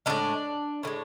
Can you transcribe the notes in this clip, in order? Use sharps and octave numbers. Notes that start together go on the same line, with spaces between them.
A2 E3 G#3 D4
A2 E3 G#3